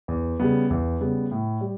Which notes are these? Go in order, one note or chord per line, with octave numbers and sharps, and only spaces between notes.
E2
C#3 G3 B3
E2
C#3 G3 B3
A2
G3